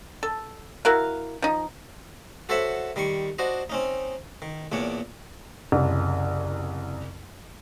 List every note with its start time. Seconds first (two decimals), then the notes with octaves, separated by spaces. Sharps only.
0.23 A4
0.85 E4 F#4 A#4 F5
1.42 F3 D#4
2.49 F#4 A4 C5 C#5 E5 F#5
2.96 D#3 G3 C6 C#6
3.39 D4 F#4 C5 D#5
3.70 C4 C#4 D#4
4.42 D#3
4.72 E2 A#2 D4 C#5
5.72 F#1 C2